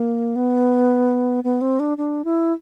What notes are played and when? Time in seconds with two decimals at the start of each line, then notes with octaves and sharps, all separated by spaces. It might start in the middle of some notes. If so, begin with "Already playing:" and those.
Already playing: A#3
0.36 B3
1.44 B3
1.61 C4
1.80 D4
1.98 D4
2.25 E4